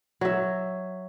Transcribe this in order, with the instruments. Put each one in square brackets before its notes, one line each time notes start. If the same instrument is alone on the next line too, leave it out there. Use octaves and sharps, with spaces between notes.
[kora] F#3 E5